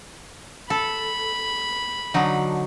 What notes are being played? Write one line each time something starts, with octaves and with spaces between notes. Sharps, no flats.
A4 B5
D3 F#3 D#4